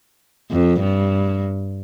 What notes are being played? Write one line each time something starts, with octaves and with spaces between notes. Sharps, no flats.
F2
G2